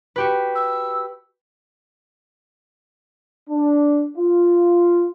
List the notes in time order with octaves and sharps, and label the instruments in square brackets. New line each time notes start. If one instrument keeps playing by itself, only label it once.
[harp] F#4 G4 B4
[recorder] E6
[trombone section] D4
F4